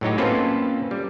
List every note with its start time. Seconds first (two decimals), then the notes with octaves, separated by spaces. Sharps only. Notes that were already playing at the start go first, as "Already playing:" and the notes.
0.01 A2 F#3 D#4 G4
0.18 A#3 C4 C#4 F4 A4 B4
0.91 G3